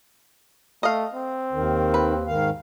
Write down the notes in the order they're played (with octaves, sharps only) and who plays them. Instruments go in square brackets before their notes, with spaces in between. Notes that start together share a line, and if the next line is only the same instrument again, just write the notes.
[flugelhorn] A3 [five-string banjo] D#5 F5
[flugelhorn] C4
[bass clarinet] D#2 [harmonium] D#3
[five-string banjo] B4
[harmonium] G#2 D#3 F5